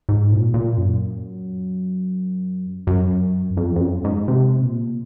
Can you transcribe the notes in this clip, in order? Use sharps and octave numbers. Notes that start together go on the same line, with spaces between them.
G#2
A#2
A#2
F#2
F#2
F2
F2
F#2
G#2
C3
A#2